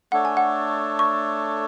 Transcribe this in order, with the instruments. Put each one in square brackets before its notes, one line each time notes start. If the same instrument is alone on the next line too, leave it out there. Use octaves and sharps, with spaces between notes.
[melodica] A3 D4 A4 C#5 [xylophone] F#5
[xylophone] G#5
F#5
C#6